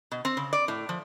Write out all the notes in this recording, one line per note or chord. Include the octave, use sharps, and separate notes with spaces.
B2
C4
C#3
D5
A2
F3